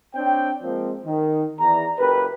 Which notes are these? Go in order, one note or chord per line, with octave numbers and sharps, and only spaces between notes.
C4 D4 C#5 G5
F3 G#3 A#3 C4
D#3
E2 D5 A#5
F#1 G4 A#4 B4